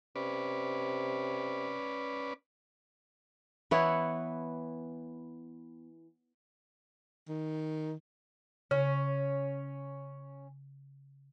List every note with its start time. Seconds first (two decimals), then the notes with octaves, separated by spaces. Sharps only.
0.16 C3 C#4 B4 D5
3.71 E3 B3 E4 C#5
7.28 D#3
8.71 C#3 C#4